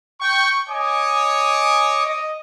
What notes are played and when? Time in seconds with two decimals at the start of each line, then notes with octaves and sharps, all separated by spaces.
0.21 G5 C#6
0.69 C#5 D#5 G#5 D6 D#6
2.05 D#5